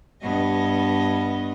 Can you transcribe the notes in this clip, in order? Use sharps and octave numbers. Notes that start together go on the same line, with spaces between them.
G2 B3 D#5